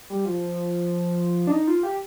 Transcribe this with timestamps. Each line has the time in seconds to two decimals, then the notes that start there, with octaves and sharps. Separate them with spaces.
0.10 G3
0.25 F3
1.47 D4
1.51 D#4
1.67 F4
1.83 G4